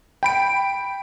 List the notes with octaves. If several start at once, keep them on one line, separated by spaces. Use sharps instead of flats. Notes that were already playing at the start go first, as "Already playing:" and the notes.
G5 B5 D7